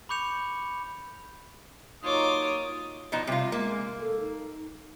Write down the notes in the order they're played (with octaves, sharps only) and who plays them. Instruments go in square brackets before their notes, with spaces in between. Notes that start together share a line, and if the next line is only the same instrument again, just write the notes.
[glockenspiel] B5 C#6 D6 G6 C#7 F7
[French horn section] F#3 A#3 D#4 [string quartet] F4 C#5 D6 [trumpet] D#6
[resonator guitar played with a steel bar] B2 F3 D#4
[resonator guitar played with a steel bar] C3 F4 [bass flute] G3
[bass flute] G#3 [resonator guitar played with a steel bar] A#3
[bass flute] A4
D#4